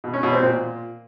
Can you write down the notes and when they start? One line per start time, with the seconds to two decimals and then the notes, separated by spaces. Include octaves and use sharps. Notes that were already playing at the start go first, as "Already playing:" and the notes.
0.04 B2
0.13 C#4
0.23 B2
0.33 C4
0.42 A#2